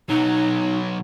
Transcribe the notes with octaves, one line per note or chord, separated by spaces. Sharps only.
B1 F#3 D#4